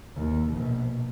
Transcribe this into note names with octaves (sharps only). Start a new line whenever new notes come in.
D#2
A#1 B2